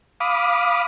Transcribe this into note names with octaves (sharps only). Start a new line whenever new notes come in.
F5 B5 D6 D#6